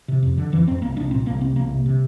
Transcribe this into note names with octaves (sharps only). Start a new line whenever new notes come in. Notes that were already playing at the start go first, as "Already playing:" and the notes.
C3
F2
D3
F2 E3
F2 C4
C2 A#3
C2 D4
A#2 C4
C2 A#3
C3 C4
C2 A#3
C3
C3